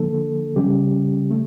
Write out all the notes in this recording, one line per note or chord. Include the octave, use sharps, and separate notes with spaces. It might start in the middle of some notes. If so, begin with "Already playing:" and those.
Already playing: D3 F3 A#3 D4 A4
C#3 G3 C#4 G4
A3